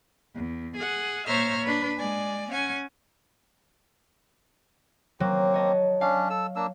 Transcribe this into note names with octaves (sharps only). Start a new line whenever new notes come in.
E2
G#4 F#5
A#2 C5 C#5 E5 A#5 F6
D4 B4
G#3 D5 G#5
C#4 F#5 G#5
F#3 A#3 C4
C#5 D#5 A5
C#4 D4 F5
A4 E6
A#3 D4 E6